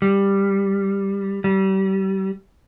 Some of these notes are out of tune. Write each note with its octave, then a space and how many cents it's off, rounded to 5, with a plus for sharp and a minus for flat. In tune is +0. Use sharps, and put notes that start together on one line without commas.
G3 +10
G3 -30